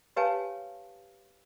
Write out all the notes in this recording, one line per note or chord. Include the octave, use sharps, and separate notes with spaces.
G4 B4 C#5 F5 G#5 A5